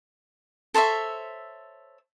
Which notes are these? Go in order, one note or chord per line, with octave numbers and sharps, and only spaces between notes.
A4 C5 C#5 E5